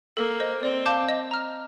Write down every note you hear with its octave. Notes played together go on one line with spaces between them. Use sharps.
A#3 A4
C5 D#5
C4 D5
F5 A5 D6 G6
D#5
A#5 F6